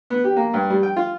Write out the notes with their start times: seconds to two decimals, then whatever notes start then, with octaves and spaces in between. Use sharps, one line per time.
0.10 B3
0.24 G4
0.36 A#3
0.54 G2
0.70 G3
0.83 G5
0.96 F4